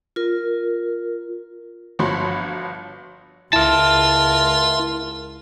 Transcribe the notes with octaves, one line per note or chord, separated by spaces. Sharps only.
F4 A#4
G1 F3 F#4 C#5 B5 C6
C#2 E4 F4 A#4 E5 A5 C6